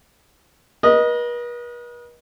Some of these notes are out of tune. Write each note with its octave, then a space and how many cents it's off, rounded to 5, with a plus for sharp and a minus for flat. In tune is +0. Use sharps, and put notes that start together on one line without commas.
B4 -45 D#5 +0